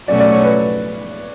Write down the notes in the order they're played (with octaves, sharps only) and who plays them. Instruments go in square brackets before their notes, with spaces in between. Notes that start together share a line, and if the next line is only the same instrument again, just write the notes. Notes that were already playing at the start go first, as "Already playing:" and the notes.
[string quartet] B2 F#3 A3 C#4 F#4 [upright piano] D5
[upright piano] D5
C#5
B4